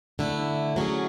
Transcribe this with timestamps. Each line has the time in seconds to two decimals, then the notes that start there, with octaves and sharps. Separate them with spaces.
0.19 D3 A3 E4
0.76 F#3 A3 C#4 G#4